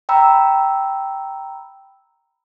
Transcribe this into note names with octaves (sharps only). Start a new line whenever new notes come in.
G5 A#5 B5 E6